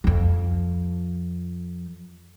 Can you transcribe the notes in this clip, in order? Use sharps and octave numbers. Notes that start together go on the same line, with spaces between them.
F2 F3